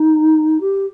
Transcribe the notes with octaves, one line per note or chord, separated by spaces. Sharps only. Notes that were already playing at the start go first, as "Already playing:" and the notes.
Already playing: D#4
G4